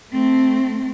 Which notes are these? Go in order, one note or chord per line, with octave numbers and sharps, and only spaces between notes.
A3 C4